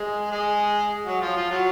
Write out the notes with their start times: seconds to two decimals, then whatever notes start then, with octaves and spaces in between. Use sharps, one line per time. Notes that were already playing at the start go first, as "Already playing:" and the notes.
Already playing: G#3 G#4
0.31 G#3 G#4
1.06 F#3 F#4
1.21 F3 F4
1.36 F3 F4
1.50 F#3 F#4